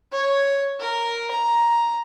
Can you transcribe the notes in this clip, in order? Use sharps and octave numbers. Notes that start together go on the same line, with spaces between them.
C#5
A#4
A#5